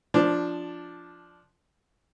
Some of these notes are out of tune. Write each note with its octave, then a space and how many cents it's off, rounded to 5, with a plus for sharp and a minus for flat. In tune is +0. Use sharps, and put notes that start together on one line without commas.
F3 +0 D4 +0